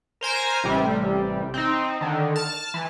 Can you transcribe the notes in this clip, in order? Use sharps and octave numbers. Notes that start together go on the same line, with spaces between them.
A#4 C5 G#5 A#5
A1 C3 G3
C4 D#4
D3 D#3
A5 F6
E3